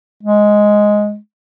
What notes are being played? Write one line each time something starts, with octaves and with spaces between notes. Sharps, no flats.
G#3